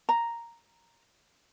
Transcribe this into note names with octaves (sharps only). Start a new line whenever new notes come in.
A#5